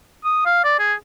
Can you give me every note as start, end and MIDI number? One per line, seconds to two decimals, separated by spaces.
0.25 0.45 87
0.46 0.64 77
0.64 0.78 74
0.79 0.94 68